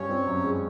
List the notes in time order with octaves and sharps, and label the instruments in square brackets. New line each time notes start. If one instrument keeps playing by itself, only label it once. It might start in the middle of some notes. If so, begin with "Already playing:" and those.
Already playing: [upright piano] G2 [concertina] C#4 C#5
[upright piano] C4
F#2
G#3